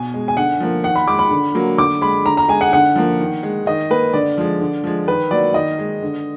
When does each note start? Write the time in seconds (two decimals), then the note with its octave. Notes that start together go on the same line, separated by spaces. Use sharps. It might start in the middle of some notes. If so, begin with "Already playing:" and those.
Already playing: B2 G#5
0.14 G#3
0.28 G#5
0.37 D3 F#5
0.60 F3 A#3
0.84 D#3 F#5
0.95 B5
1.07 G#3 D6
1.19 B5
1.31 D3
1.55 F#3 A#3
1.78 D3 D6
2.01 G#3 B5
2.26 D3 A#5
2.37 A#5
2.48 G#3 G#5
2.61 F#5
2.73 D3 F#5
2.96 F3 A#3
3.20 D#3
3.43 G#3
3.66 D#3 D#5
3.91 A#3 B4
4.13 D3 D5
4.38 F3 G#3
4.61 D3
4.84 F3 G#3
5.08 D#3 B4
5.31 F#3 A#3 D5
5.54 D#3 D#5
5.79 G#3
6.02 D3